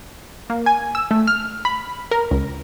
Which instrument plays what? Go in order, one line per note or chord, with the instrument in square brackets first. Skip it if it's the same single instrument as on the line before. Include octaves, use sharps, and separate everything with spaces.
[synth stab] A#3
G#5
E6
A3
F6
B5
A#4
C#2